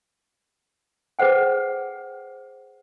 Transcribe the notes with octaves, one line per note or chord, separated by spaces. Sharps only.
G#4 B4 C5 F#5 G5